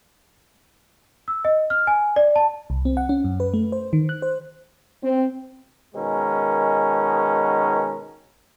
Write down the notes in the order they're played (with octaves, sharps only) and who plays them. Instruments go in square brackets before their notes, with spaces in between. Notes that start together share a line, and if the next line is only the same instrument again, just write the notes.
[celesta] E6
D#5
F6
G#5
D5
A5
[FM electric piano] C2
C4
F#5
C#4
F#2
B4
A3
C5
D#3
F#6
C5
[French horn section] C4
[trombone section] B2 D#3 G#3 C#4 A#4